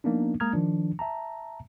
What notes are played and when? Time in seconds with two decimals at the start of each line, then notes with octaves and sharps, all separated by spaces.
0.04 F3 A#3 B3 D4 D#4
0.40 G#3 A#3 A#5 D#6 F6 G#6
0.53 D#3 F3 D4
0.99 E5 A5 A#5